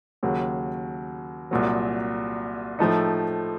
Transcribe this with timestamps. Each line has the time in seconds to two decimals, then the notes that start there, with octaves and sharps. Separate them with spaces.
0.23 D#2 C#3 F#3
1.51 C2 A#2 F#3
2.79 A2 F3 A3 D#4